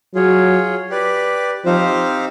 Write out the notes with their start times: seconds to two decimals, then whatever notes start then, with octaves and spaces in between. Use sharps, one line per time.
0.15 F#3 F4 G#4 C#5
0.90 G4 B4 D5
1.65 F3 C4 D#4 G4 C5 F5